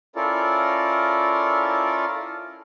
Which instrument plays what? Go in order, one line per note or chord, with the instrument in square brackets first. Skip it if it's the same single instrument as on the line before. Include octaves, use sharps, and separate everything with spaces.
[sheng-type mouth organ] C#4 E4 F4 A4 A#4 D5